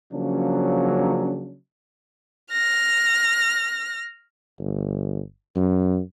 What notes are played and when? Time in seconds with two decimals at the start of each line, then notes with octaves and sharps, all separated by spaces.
0.12 C#3 F3 F#3 A#3 C#4 D4
2.52 F6 A#6
4.59 G1
5.56 F#2